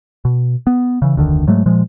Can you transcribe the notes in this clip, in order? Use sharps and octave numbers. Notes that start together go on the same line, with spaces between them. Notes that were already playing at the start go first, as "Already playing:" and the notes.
B2
B3
C#3 E3
F1 D2 D3 D#3
G#2 F#3 G#3 A3
A#2 F3 G#3